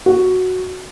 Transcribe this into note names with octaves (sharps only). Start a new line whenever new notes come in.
F#4